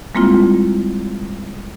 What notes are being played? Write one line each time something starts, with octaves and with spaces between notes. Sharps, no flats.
G3 G#3 A#3 C4 E4 F4